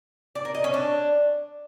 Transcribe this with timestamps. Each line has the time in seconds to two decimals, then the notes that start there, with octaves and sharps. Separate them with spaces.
0.35 D5
0.45 A#4
0.55 D#5
0.64 C#4
0.74 D4